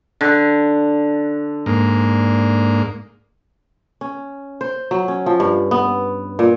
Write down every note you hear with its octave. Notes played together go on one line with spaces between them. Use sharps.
D3
G#2 A#3
C#4
C5
F#3
C#4
F3
G2
B3
A#2